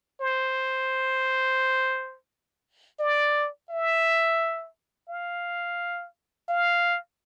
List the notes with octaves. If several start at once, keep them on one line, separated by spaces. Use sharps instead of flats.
C5
D5
E5
F5
F5